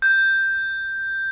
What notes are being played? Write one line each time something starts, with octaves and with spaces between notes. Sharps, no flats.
G6